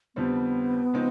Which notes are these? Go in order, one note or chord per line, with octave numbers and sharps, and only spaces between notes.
F2 D3 G3 B3 C4
C#3 F3 G#3 C4 D#4